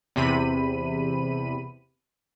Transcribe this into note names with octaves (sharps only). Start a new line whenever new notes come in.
E2 C3 B5 D#7